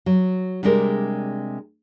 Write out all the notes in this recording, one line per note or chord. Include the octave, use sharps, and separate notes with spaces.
F#3
C3 G3 G#3 D4 A#4